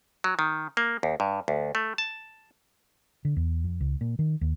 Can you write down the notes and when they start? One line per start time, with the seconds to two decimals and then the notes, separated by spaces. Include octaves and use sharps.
0.24 F#3
0.39 D#3
0.77 A#3
1.03 D#2
1.20 G2
1.48 D2
1.75 A3
1.98 A5
3.25 D3
3.36 E2
3.64 F2
3.81 C#2
4.01 A#2
4.19 D#3
4.41 D#2